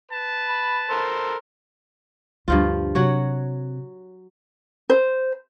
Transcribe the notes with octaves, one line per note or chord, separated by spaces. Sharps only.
B4 A5
B5
A4 A#4 C5
D2 G2 F3 F4
C3 F#3 F#4 C#5
C5